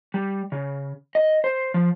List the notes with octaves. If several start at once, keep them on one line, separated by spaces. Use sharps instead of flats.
G3
C#3
D#5
C5
F3